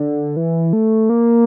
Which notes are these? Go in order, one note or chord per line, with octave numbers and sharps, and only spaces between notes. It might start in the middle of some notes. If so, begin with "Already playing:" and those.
Already playing: D3
E3
A3
A#3